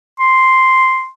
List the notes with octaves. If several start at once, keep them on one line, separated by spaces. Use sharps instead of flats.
C6